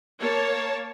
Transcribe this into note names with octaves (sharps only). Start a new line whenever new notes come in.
A#3 C#5 A5